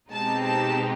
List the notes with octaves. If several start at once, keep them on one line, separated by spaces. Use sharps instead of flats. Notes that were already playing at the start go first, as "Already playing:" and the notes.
B2 G#3 C4 D#4 G4 A5
A5